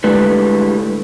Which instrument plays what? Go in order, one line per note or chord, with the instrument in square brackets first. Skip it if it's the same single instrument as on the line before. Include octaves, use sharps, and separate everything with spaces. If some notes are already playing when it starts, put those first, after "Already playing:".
[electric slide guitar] A2 D3 G3 G#3 B4